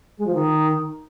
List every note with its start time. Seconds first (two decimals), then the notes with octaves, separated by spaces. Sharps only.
0.17 G#3
0.26 F3
0.34 D#3